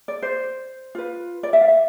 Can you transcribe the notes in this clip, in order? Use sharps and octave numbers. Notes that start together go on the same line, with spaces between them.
D5
C5
F4 B4
D5
E5
F5
E5